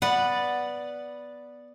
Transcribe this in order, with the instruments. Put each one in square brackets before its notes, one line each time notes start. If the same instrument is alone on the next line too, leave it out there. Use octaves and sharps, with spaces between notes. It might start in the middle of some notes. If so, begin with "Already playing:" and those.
[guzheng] B3 B4 F#5 [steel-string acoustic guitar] D5